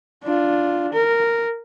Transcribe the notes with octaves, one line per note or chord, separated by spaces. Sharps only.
D4 F4
A#4